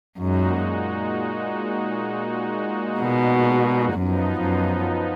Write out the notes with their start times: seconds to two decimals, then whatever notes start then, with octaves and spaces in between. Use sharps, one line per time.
0.19 F#2 A#2 G#3 D#4 F#4
3.01 B2
3.94 F#2 F3 B3 D#4
4.41 F#2